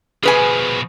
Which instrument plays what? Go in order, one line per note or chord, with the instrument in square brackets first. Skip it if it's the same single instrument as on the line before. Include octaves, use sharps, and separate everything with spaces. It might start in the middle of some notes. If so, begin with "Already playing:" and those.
[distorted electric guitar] B2 F3 [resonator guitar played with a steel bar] G#4 B4 G#5